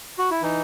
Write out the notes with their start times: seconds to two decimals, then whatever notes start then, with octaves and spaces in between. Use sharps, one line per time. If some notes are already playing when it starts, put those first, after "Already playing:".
0.19 F#4
0.31 E4
0.42 E3 D#4